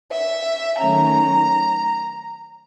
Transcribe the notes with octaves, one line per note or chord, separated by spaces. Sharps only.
E5
D#3 F#3 A3 C#4 A#5